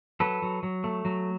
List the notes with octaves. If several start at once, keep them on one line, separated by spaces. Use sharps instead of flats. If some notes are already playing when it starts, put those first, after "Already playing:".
F#3 A4 B4
F#3
F#3
A3
F#3